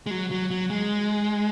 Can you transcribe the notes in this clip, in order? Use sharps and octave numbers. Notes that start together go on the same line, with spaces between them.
G#3
F#3
F#3
F#3
G#3